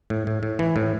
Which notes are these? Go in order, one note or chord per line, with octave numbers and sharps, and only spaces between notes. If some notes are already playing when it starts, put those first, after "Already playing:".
A2
A2
A2
E3
A2